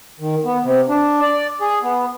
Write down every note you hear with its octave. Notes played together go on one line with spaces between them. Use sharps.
D#3
B3
C3
D4
D5
G#4
B3